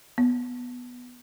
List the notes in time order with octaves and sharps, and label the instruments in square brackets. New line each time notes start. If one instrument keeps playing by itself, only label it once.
[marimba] B3